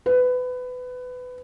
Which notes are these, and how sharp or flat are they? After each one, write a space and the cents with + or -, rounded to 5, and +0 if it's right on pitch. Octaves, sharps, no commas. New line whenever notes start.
B4 +20